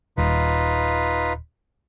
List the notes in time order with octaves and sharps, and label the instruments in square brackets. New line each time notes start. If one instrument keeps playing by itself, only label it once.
[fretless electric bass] D#1 [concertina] D#4 F4 B4